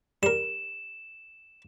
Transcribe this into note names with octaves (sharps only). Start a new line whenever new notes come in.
G3 A#4 E7